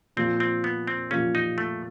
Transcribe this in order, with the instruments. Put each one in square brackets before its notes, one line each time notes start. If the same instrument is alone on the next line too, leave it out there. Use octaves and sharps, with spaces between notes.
[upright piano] A#2 F3 A#3 [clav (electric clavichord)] C4
[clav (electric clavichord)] C4
B3
C4
[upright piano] A#2 F3 A#3 [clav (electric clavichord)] C#4
[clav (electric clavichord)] D#4
A3